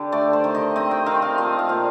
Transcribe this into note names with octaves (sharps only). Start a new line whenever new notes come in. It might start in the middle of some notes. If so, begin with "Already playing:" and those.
Already playing: D3 G4
A3 D5
C5
D#3
D#5
C4 D#5
G5
D#3 F5
F5
F3 D#5
F5
A#2